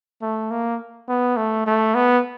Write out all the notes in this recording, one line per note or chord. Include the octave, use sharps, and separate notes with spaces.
A3
A#3
B3
A3
A3
B3